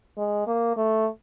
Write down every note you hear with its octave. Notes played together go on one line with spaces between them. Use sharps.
G#3
A#3
A3